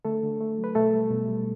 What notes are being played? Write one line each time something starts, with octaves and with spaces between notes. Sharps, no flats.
D3 A3 A4
D3
A3
F#3
B4
B2 A3 A4
G3
B2
G3